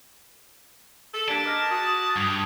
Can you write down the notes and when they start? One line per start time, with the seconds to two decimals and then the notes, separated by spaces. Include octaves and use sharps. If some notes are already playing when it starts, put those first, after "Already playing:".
1.14 A4
1.28 G3 A#3 D4 A5 G#6 B6 D7
1.46 G#3 D#4 A#4 D6 F6 A#6
1.71 F#4 D#6
2.17 G2 G#6 F7